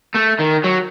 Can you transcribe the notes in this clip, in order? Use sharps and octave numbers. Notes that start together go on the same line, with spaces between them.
A3
D#3
F#3